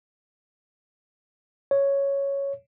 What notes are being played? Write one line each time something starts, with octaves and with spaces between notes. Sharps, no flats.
C#5